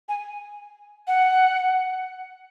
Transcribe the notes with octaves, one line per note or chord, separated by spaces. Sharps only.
G#5
F#5